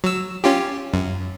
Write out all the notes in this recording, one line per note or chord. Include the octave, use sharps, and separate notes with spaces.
F#3 E6
C#4 F4 G4
F#2